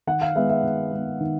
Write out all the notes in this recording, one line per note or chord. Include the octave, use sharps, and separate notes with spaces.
D#3 F#5
F5
G#3 B3 E5
E5
D#3
G#3 B3
D#3